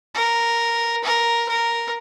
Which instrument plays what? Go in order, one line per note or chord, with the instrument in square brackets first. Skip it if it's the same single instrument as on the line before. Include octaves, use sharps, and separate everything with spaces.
[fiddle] A#4
A#4
A#4